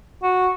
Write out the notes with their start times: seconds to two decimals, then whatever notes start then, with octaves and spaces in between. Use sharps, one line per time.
0.23 F#4